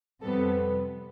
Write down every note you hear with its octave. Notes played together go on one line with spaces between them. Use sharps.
F2 C3 G3 B3 A4